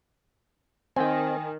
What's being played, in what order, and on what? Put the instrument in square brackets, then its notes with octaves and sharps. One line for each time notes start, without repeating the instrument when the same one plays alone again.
[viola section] D#3 [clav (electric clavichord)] C4 [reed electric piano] G5 G#5